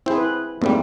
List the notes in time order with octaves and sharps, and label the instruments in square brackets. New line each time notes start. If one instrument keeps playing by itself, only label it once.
[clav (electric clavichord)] C4 C5 [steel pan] E4 G#4
[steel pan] B4
[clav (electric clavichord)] F2 G#2 G3 [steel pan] A3 A#3 C4